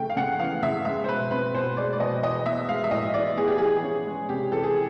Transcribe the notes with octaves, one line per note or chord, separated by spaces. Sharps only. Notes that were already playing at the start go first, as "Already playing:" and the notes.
Already playing: C#3 A3 G5
F5
C#3 F#5
E3 F5
C#3 E5
G#3 E5
C5
B2 B4
C4 B4
B2 C5
G#3 D5
D5
B2 D#5
E3 D#5
B3 E5
G#3 F5
E5
A2 D#5
E3 D5
B3 G#4
G4
E3 G#4
C#4
G#3
C3 G4
E3 A4
G#4